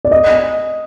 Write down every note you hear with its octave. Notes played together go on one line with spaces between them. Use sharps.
D5
D#5